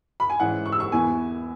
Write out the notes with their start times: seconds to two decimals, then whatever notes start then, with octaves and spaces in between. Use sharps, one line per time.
0.20 B5
0.30 G#5
0.40 G#2 E3 C#4 E4 F#5
0.66 C#6
0.72 E6
0.80 C#6
0.92 E2 E3 B3 E4 G#5